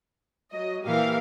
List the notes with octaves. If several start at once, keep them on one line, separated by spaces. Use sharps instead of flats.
F#3 D#5
A#2 E3 G4 A#4 F5